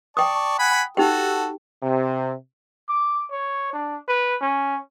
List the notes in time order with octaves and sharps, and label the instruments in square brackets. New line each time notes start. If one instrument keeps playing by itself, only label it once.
[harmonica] D5 A5 C#6 [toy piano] G5 D#6
[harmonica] F#5 G#5 B5
[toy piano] D#4 G4 G5 [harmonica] F#4 A4
[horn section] C3
[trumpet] D6
C#5
D4
B4
C#4